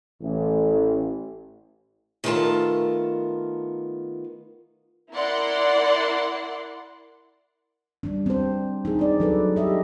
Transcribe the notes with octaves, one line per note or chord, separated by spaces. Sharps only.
A1
D#3 A3 B3 F4 A#4 A5
E4 A#4 D5 F#5 C6
G3 D4
C4 C5
D#4 G#4
D4 D5
F#3 A4 B4
G4 D#5 E5